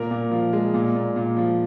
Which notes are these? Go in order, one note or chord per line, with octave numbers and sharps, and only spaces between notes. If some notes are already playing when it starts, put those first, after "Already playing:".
Already playing: A#2 A#4
A#2
F3
G#3
A#2
A#2
A#2
F3